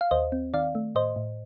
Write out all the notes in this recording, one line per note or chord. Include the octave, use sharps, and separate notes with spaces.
F5
D#2 C5 D#5
C4
D#3 D5 F5
A3
A2 C5 D#5
A2